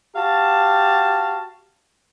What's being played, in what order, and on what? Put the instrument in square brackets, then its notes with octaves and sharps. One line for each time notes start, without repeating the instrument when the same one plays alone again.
[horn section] F#4 G4 F5 A5